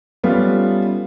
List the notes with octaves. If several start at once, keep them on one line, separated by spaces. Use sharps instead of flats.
G3 A3 B3 C#4 F4